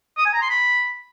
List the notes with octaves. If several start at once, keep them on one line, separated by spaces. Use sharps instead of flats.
D#6
G#5
A#5
C6
B5